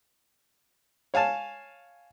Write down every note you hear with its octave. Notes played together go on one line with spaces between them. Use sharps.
C#5 F5 G#5 A5